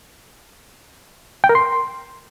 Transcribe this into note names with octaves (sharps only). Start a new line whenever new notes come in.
G5
A#4
C6